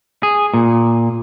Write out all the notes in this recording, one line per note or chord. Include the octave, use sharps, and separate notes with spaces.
G#4
A#2